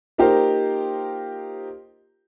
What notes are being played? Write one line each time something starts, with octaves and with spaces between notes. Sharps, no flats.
A#3 D#4 F4 G4 A#4 C5